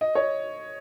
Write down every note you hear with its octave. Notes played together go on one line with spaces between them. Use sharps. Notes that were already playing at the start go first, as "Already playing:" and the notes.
D#5
C#5